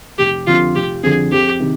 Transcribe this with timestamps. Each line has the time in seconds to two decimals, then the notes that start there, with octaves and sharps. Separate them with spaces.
0.19 F1 G4
0.47 F2 D3 F3 F4
0.75 F1 G4
1.03 F2 D3 F3 G#4
1.32 F2 G4
1.60 C3 D#3